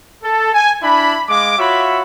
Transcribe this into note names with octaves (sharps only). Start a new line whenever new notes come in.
A4
G#5
D4 E4 B5
G#3 F5 D6
F4 F#4 C#5 E5 B5